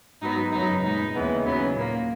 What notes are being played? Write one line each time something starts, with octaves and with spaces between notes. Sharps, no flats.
G#2 F#3 B3 D#4
F#2 C#3 F#3 B3 D#4
A#2 G#3 B3 D#4
D#2 C#3 E3 G#3 B3
D#2 C#3 F#3 B3 C#4
A#2 A#3